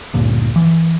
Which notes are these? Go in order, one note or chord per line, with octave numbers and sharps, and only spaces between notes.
D2 G2 A#2
E3